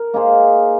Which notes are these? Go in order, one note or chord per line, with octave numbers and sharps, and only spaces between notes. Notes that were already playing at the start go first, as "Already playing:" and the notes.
Already playing: A#4
A#3 D#4 G#4 C5